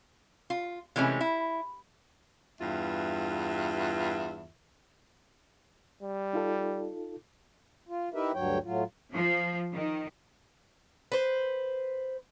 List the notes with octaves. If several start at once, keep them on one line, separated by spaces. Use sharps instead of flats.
F4
C3 E3 G#3 A3 C#4
E4
E2 G2 F4 E5
G3
D#4 F4 A4
F4
D#4 E4 G4 A#4 B4 E5
D2 G2 F#3 C#5 G5
A2 F#3 F4
F3
D#3
B4 C5